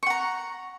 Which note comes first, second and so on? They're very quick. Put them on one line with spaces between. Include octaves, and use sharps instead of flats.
C#6 F#5 A#5